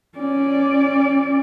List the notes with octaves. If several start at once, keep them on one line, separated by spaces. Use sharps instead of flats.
C#4 D5